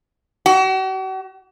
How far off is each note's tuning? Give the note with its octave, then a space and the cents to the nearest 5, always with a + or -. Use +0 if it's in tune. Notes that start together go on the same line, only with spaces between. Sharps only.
F#4 +45